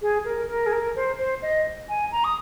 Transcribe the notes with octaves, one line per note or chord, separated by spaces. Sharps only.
G#4
A#4
A#4
G#4
A#4
C5
C5
D#5
G#5
A#5
D#6